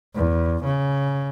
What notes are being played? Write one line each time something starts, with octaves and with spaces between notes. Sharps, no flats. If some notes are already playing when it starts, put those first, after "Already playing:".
E2
C#3